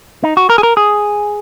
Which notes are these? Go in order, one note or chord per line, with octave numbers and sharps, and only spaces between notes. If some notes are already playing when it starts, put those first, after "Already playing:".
D#4
F#4
A#4
G#4
A#4
G#4